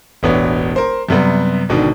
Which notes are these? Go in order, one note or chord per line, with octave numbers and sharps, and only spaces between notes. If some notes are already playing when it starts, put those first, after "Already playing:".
E1 A1 B3 D4 C#5
A#4 C5
F#2 C3 G3 B3
G#1 B2 D3 D#3 D4